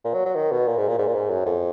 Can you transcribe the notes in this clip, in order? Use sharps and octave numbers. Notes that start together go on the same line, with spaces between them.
A#2
F#3
F#3
D#3
B2
A#2
G#2
A#2
G#2
A#2
G#2
F#2
F2